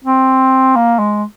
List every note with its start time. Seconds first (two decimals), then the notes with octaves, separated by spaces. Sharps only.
0.04 C4
0.75 A#3
0.99 G#3